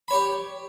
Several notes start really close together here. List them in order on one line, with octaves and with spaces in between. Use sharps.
B5 C#5 G4